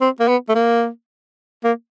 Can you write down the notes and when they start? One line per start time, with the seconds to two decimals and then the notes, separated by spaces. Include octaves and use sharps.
0.01 C4
0.20 A#3
0.28 B3
0.49 A3
0.55 A#3
1.64 A#3